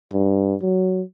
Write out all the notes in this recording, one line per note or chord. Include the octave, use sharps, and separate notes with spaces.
G2
F#3